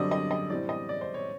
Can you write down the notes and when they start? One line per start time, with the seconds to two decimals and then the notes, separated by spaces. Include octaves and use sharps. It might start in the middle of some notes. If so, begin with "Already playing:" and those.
Already playing: F#2 D3 G3 C4 D5 D#5
0.11 D#5
0.31 D#5
0.50 A2 E3 G3 C4 D5
0.69 D#5
0.89 D5
1.01 C5
1.14 C#5